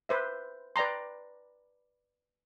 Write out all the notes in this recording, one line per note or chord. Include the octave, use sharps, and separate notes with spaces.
B4 C5 E5
B4 D5 G5 A#5 C6